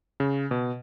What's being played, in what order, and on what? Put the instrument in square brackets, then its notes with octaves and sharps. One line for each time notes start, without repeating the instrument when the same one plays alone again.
[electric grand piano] C#3
B2